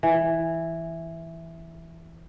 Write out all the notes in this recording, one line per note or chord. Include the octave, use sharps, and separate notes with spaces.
E3